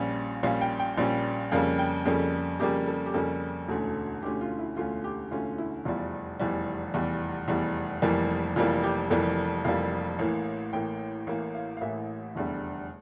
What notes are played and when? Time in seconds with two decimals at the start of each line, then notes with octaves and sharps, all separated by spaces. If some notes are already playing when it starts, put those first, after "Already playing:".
Already playing: A#1 A#2 G3 C#4
0.43 A#1 A#2 G3 C#4 F5
0.61 G5
0.80 G5
0.98 A#1 A#2 G3 C#4
1.52 F2 C#3 G3 A#3 C#4 F5
1.79 G5
2.06 F2 C#3 G3 A#3 C#4 A4
2.60 F2 C#3 G3 A#3 C#4 G4
2.88 A4
3.06 G4
3.14 F2 C#3 G3 A#3 C#4 A4
3.68 E1 D2 D3 A3 C#4
4.23 E1 D2 D3 A3 C#4 G4
4.41 F4
4.59 E4
4.76 E1 D2 D3 A3 C#4 F4
5.04 G4
5.31 E1 D2 D3 A3 C#4 F4
5.58 E4
5.85 F1 E2 E3 G3 F4
6.39 F1 E2 E3 G3
6.94 F1 E2 E3 G3
7.48 F1 E2 E3 G3
8.02 F1 F2 E3 G3 A#3
8.56 F1 F2 E3 G3 A#3 F4
8.83 G4
9.10 F1 F2 E3 G3 A#3 A4
9.64 F1 F2 E3 G3 A#3 F5
10.19 A1 A2 E3 A#3
10.73 A1 A2 E3 A#3 G5
11.27 A1 A2 E3 A#3 F5
11.54 F5
11.77 F5
11.81 A1 A2 E3 A#3 E5
12.36 F1 E2 D3 G3